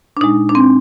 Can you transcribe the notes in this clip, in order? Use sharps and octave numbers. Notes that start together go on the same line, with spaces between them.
D4
A#2 G#3 D#4
D4
C4